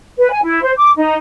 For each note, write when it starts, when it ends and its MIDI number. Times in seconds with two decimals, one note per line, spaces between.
0.17 0.30 71
0.31 0.43 80
0.43 0.60 64
0.63 0.72 72
0.77 0.91 86
0.96 1.16 63